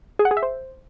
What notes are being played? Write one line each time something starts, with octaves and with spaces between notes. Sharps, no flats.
G#4
F#5
G#4
E5
C5